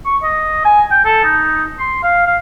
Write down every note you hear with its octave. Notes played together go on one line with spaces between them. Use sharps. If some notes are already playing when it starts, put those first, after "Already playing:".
C#6
D#5
G#5
G5
A4
D#4
C6
F5
F5